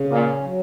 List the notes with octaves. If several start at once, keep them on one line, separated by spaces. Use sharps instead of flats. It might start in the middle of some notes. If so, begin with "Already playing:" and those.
Already playing: C#3
A#2 C#4
F#3